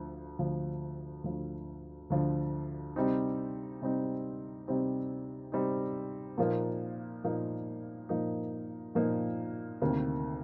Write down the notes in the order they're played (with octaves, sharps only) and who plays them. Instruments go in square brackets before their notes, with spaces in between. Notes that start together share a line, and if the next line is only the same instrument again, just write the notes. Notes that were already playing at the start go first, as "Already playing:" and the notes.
Already playing: [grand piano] D2 D3 F3
D2 D3 F3
D2 D3 F3
D2 D3 F3
C3 G3 C4 D#4
C3 G3 C4 D#4
C3 G3 C4 D#4
C3 G3 C4 D#4
A#2 F3 A#3 D#4
A#2 F3 A#3 D#4
A#2 F3 A#3 D#4
A#2 F3 A#3 D#4
D2 C3 D#3 A#3